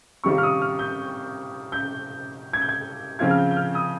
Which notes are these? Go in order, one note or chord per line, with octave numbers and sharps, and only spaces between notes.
C3 D#3 G3 C4 F4 C#6
F6
D#6
F6
G6
G6
G#6
G6
G#6
C#3 F3 C4 F4 G#6
F6
G6
G6
F6
D#6